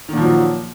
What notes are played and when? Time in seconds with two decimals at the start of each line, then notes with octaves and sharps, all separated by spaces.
0.09 D#3
0.13 A#2
0.17 F3
0.22 F#3